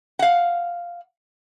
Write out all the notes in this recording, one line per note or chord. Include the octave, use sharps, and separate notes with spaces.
F5 F#5